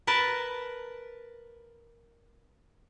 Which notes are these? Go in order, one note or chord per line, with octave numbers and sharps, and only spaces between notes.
A#4 B4 A5